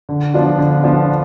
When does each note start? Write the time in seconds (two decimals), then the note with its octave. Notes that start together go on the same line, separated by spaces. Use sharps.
0.09 D3
0.34 F3 B3 D4 F4
0.59 D3
0.84 F3 B3 D4 F4